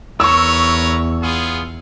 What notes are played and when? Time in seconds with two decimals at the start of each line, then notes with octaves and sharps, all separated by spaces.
0.20 E2 A#4 B4 C#5 C#6 E6
1.22 B3 F4 G#4